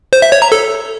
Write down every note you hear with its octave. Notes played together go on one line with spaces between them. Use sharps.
C5
E5
C#5
A#5
A4